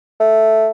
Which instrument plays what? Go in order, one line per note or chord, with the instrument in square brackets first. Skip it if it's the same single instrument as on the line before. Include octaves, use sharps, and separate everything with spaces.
[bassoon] A3